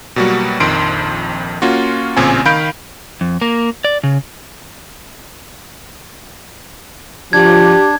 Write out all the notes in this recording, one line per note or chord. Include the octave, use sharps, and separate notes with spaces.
B2 F#3 G3 A#3 F#4
A#1 F2 D#3 C6 D7
A#3 C#4 F4 F#4
A1 A#2 C#3 A#3 C4 G#5
D#3 F5 B5 G6 D7
F2
A#3
D5
C#3
F3 D4 G4 G#6